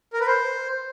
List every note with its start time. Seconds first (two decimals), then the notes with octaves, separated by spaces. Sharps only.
0.13 A#4
0.20 B4
0.27 C5